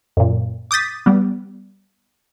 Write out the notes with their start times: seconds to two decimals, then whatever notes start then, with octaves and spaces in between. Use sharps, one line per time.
0.17 F#2 A#2
0.71 D6 D#6 G6 A6 B6
1.06 G3 B3